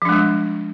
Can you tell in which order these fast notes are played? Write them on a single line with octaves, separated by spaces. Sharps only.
F3 D4 G#3 G3